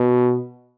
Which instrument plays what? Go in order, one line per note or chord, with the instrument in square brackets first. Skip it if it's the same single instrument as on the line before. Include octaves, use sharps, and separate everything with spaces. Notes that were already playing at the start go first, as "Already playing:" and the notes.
Already playing: [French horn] B2